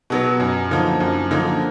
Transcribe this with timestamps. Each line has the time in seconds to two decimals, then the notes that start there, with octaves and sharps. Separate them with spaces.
0.10 B2 F#3 B3
0.40 F#2
0.71 D3 F3 A#3 D#4
1.00 F#2
1.31 D3 F3 A#3 D#4